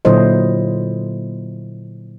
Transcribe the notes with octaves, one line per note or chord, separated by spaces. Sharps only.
A#2 D3 F#3 E4 C5 D#5